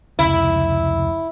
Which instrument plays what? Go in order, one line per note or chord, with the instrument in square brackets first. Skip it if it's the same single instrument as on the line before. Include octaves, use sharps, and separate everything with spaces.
[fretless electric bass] F1 C#2 [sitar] E4